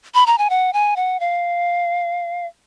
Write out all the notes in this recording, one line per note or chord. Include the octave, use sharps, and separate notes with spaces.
B5
A#5
G#5
F#5
G#5
F#5
F5